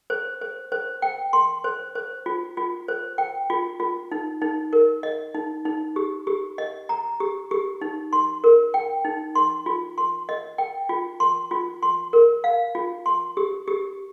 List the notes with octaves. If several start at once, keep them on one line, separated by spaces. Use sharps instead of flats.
C5
C5
C5
G5
C6
C5
C5
F4
F4
C5
G5
F4
F4
D#4
D#4
A#4
D#5
D#4
D#4
G4
G4
D#5
A#5
G4
G4
D#4
C6
A#4
G5
D#4
C6
F4
C6
D#5
G5
F4
C6
F4
C6
A#4
F5
F4
C6
G4
G4